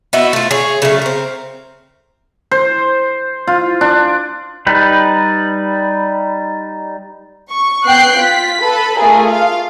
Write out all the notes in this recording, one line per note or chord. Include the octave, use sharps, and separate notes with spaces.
B3 D#4 E4 F#4
A3 F4
G#4 C#5
C#3 F#3 A3
C4 A#4
C5
F4
D4
G3 D#4 B4
C#6
B3 G5 F#6 C7
F4 B6
A4 B4 B5
A3 F4 G#4 A#4
F4 F5